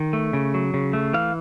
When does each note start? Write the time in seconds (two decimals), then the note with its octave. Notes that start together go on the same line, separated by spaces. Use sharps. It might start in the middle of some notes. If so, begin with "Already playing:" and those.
Already playing: D#3
0.13 A3
0.33 C#3
0.54 F#3
0.74 C#3
0.93 A3
1.13 E3 F5